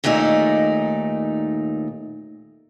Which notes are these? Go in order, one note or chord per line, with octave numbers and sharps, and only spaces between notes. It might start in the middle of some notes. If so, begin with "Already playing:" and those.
D#2 A#2 A3 D#4 D5